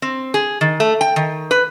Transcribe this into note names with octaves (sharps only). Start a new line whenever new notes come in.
C4
G#4
D#3
A3
G5
D#3
B4